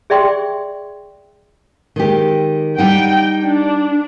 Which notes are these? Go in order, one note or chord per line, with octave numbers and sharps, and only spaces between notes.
G#4 D5 E5 G5 C6 C#6
D#3 G#3 G4
G3 D#4 F#5 G5
D4